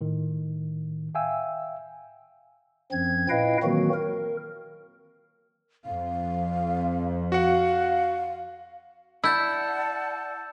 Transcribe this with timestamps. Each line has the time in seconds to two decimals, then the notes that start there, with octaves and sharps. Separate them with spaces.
0.01 A2 D#3
1.15 E5 F5 G5 G#5 E6
2.92 F#2 F3 C4 G#6
3.29 A#2 E4 B4 D#5 F5 G5
3.63 D#3 E3 F#3 A#3 C4 F#4
3.94 A#4
5.85 F2 F5
7.32 F#4 F5 F#5
9.24 E4 D5 F#5 A5 E6 G6 A6